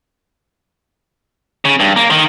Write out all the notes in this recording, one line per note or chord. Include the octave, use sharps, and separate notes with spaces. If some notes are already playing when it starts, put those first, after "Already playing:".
C#3
G2
A#3
D#3